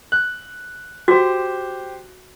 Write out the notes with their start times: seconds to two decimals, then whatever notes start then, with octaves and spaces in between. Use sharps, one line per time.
0.12 F#6
1.08 F#4 G4 C5